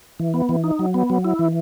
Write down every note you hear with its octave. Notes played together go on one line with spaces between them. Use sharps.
E3
B3
E3
D#4
F#3
B3
F#3
E4
E3